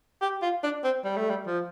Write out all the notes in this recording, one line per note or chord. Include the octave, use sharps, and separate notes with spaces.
G4
F4
D4
C4
G3
A3
G3
F3